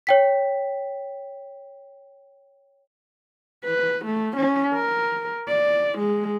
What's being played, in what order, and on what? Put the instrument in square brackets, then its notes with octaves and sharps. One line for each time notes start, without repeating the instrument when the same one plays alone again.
[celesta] C#5 G5 B6
[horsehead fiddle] B4
A3
C#4
A#4
D5
G#3